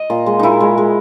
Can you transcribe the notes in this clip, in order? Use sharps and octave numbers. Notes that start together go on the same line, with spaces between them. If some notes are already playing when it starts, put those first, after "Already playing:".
Already playing: D#5
A#2
G#3
A#2 D#4 E4
G#3
G#3